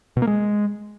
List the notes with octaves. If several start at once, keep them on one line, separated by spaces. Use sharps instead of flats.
B2
A#3
G#3